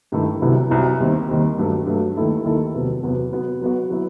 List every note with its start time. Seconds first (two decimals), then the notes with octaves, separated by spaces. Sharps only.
0.12 G2 D#3 A3 E4 G4
0.41 C2 C3 F#3 B3 E4
0.70 C2 C3 F#3 B3 E4
1.00 D#2 D#3 G3 C4
1.29 D#2 D#3 G3 C4
1.58 G2 F#3 A3
1.86 G2 F#3 A3
2.16 D#2 D#3 A3 E4 A4
2.45 D#2 D#3 A3 E4 A4
2.74 E2 C3 F#3 B3
3.03 E2 C3 F#3 B3
3.32 F#3 B3 F#4
3.61 F#3 B3 F#4
3.90 F#3 B3 E4